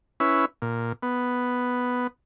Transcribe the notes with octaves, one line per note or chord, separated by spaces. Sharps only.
C#4 E4 B4
A#2
B3